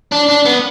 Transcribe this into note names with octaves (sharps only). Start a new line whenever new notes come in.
D4
D4
B3